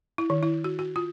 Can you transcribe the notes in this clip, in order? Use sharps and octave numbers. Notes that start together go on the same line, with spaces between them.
E4
D#3
E4
F#4
F#4
F4